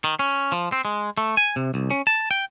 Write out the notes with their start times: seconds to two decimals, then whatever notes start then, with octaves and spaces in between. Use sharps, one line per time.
0.04 D#3
0.19 C#4
0.52 F3
0.72 C4
0.85 G#3
1.18 A3
1.37 G#5
1.56 C3
1.74 C2
1.90 C#4
2.07 A5
2.31 G5